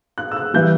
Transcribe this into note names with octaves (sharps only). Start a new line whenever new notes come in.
F#6
E6
F#6
E3 G3 G6